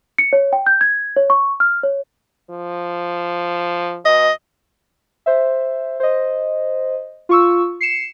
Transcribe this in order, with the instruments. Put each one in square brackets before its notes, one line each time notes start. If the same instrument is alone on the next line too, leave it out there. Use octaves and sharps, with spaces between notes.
[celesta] C#7
C#5
G5
G6
G#6
C#5
C#6
F6
C#5
[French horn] F3
[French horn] B2 [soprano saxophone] D#5
[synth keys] C5 E5
C5 D#5
F4 C#6 E6
C7 C#7 E7